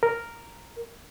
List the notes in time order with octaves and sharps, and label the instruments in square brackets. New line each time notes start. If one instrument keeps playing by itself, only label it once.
[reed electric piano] A#4